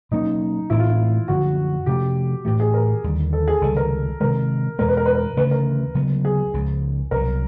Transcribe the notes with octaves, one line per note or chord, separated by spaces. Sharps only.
B2 F#3 A#3 C#4 D#4
A2 E3 A3 C4 E4
F4
E4
F#2 D3 F3 F#4
C3 F3 A3 C#4 G4
A2 E3 A3 G4
G#4
A#4
D#2 D3 G3
A4
G#4
C#2 C3 D#3 G3 A4
A#4
C3 D#3 G#3 A#4
E2 B2 G#3 B3 A#4
B4
A#4
B4
A#4
D2 C#3 E3 A3 B4
A#4
D2 C#3 F#3 B3
G#4
C#2 C#3 F3
C2 B2 F#3 A#4